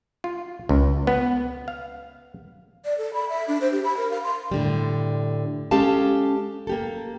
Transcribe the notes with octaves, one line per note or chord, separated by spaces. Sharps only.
F4
C#2
B3
F5
D5
A4
B5
E5
D4
C5
G4
B5
A#4
F5
C6
A2 D3 G3
G#3 C#4 G4 A4 F5 A5
A#3 G4 A4